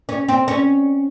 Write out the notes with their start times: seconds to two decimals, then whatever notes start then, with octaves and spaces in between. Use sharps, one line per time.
0.09 C#4
0.28 C4
0.48 C#4